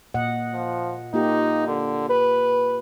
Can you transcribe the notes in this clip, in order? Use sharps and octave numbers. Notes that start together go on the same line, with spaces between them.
A#2 D#5 F#5
F3
A#3 D#4 F4 G4
D3
B4